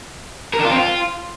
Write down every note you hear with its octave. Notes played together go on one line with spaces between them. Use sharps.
A#4
D4
F4
C4
F4